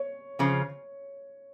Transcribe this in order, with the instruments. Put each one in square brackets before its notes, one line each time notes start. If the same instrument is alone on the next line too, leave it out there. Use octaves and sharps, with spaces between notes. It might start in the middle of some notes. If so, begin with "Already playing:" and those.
Already playing: [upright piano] C#5
[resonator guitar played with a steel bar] F2 C#3 F3